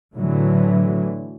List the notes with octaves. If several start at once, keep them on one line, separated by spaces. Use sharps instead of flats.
A2 D3 E3 F#3